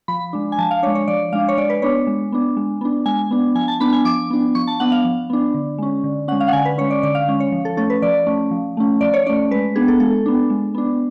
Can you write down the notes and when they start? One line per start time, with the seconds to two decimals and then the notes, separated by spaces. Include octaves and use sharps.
0.08 F3 B5
0.33 G#3 D4
0.52 G#5
0.58 F3 A5
0.71 F5
0.83 D4 C#5
0.87 G#3
0.95 C#5
1.08 F3 D5
1.33 G#3 D4 F5
1.48 C#5
1.58 G#3 D5
1.70 B4
1.82 B3 D4 C#5
2.07 G#3
2.32 B3 D4
2.57 G#3
2.81 B3 D4
3.06 G#3 G#5
3.31 B3 D4
3.55 F3 G#5
3.68 A5
3.80 B3 D4 B5
3.92 G#5
4.05 F3 D6
4.30 B3 D4
4.55 F3 C#6
4.67 A5
4.80 B3 D4 F#5
4.92 F5
5.05 F3
5.30 B3 D4
5.54 D3
5.78 G#3 C#4
6.04 D3
6.28 C#4 F#5
6.32 G#3
6.40 F5
6.48 F#5
6.53 D3 G#5
6.65 B4
6.78 G#3 C#4 C#5
6.90 D5
7.03 D3 D5
7.15 F5
7.28 G#3 C#4
7.40 C#5
7.52 F3
7.65 A4
7.77 A3 C#4 A4
7.90 B4
8.02 F3 D5
8.27 A3 C#4
8.51 F3
8.77 A3 C#4
9.01 F3 D5
9.14 C#5
9.26 A3 C#4 D5
9.51 G#3 B4
9.76 B3 D4 G#4
9.88 A4
10.00 G#3 A4
10.26 B3 D4
10.50 G#3
10.75 B3 D4